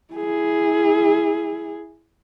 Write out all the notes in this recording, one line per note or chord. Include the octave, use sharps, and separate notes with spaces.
E4 G#4